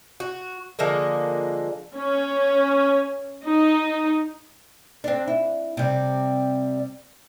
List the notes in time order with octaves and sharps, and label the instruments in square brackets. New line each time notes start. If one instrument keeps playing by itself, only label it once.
[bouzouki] F#4
D3 F3 G#3 A#3
[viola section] C#4
D#4
[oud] C4 D4
E4
C3 G3